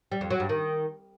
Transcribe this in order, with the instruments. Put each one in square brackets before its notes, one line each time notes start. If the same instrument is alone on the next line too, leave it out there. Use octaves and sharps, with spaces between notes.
[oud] G3
F2
F#3
G2
D#3